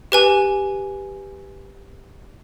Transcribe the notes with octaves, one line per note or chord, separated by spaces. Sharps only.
G4 B4 G#5